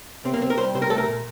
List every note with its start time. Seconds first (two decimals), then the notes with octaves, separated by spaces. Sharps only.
0.25 C3 C4
0.34 A#3
0.41 C3 C4
0.50 A#4
0.58 G3 C5
0.74 C3 C5
0.82 A#4
0.90 A3 A4
0.98 A#4
1.08 A#2